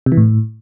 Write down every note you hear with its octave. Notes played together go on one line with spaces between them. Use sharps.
C3
E3
A2